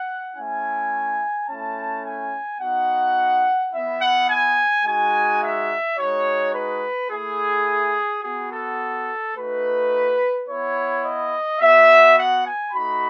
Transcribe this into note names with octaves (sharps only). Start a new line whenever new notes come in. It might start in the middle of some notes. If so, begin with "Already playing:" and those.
Already playing: F#5
A3 C#4 E4 G#5
A3 C#4 E4 A5
G#5
B3 D#4 F#4 F#5
B3 E4 E5
F#5
G#5
G#3 D#4 F#4 G#5
E5
G#3 D#4 F#4 C#5
B4
A3 E4 G#4
B3 F#4 G#4
A4
A3 D#4 F#4 B4
B3 E4 C#5
D#5
B3 F#4 E5
F#5
G#5
A3 D#4 F#4 B5